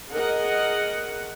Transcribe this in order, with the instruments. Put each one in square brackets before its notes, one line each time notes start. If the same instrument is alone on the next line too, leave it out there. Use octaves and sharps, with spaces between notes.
[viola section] G#4 A#4 D#5 F#5